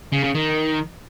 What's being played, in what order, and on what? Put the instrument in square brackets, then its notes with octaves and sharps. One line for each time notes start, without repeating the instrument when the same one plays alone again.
[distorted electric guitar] C#3
C#3
D#3